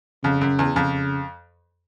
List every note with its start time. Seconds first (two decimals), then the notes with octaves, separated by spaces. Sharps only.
0.23 F2 C#3
0.41 F#2
0.59 E2
0.76 F2 C#3